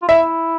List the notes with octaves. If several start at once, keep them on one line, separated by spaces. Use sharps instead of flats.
F4
E4 E5